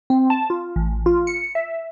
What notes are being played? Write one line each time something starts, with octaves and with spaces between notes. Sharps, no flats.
C4
A5
F4
A1
F4
C#7
E5